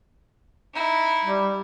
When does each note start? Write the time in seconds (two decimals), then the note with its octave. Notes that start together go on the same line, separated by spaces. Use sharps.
0.74 D#4 E4
1.25 G3